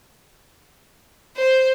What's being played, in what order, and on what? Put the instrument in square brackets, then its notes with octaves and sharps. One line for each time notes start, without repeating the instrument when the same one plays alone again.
[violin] C5